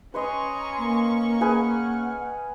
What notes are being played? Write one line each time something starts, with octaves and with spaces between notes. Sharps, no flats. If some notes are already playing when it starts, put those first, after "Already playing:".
C#4 B4 C#5 D#5 G#5 A#5 C6 C#6
A#3
G#4 B4 F#5 G#5 F6